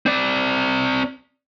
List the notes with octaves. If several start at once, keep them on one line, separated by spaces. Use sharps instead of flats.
C4 D5